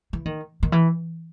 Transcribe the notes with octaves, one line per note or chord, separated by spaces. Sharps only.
E3
D#3
D#3
E3